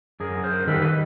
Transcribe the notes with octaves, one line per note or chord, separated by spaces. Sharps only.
F#2 G#4 A#4
A#4 C5
D#3 G3 A4 B4
B4